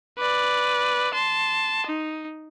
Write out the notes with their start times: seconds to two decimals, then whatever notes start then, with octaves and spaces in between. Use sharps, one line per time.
0.18 B4 D5
1.14 A5 C6
1.87 D#4